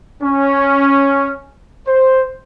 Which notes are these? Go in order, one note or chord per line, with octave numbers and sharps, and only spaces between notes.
C#4
C5